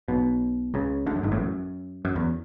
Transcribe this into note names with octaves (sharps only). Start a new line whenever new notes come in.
B1 B2
C#2 C#3
D2 D3
F#2
G#1 G#2
A1 A2
F#2
F#2
E2